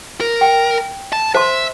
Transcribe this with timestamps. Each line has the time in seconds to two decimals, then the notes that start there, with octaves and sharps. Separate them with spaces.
0.21 A#4
0.41 G5
1.13 A5
1.35 C5 E5 A5 C6